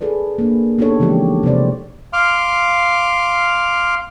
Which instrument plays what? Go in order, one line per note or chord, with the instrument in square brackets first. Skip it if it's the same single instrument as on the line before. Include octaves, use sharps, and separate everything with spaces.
[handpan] G#4 A4 B4 D5
A#3 D4
B3 D4 D#4 G4 A4 C#5
C#3 E3 F3 G#3 G4
C3 B4 C5 D5
[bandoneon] F5 C6 D6 F6